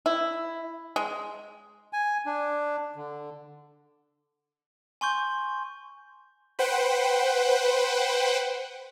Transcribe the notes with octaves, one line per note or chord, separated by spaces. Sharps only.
E4
G#3
G#5
D4
D3
G#5 C6 C#6 G6
B4 C5 F#5 G5